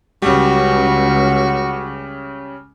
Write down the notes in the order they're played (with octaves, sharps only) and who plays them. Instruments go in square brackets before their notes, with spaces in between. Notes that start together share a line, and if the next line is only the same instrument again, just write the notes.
[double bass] C#2 [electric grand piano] C#3 G3 [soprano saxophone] F#4